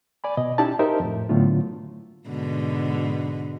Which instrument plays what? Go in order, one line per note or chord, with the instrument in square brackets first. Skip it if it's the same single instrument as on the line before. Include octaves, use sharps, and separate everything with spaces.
[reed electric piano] D5 G#5 B5
B2 D#5
C#4 D#4 E4 G4 D5 A5
D#4 G4 A#4 C5 E5
F2 A2
A2 D3 F#3 A3 B3 F4
[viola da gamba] G#2 B2 D3